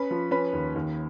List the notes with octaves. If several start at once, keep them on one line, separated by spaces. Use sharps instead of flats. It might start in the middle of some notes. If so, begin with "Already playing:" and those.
Already playing: C#4 B4 B5
F3
C#4 B4 B5
D#2
D#2